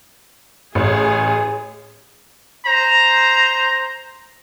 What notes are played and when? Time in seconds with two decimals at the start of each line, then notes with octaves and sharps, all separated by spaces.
0.75 A1 G#4
2.66 C5 A#5